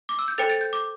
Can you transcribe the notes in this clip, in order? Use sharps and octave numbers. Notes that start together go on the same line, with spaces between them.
D6
E6
G6
A4 C5 G5 A6
A6
G6
D6